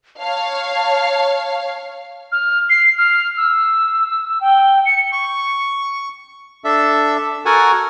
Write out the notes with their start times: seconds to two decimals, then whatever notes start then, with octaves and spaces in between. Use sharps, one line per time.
0.19 C#5 F5 A5
2.32 F6
2.70 C7
2.98 F6
3.37 E6
4.41 G5
4.85 C#7
5.12 C#6
6.64 D4 A4 E5
7.45 F#4 A4 A#4 F#5 G#5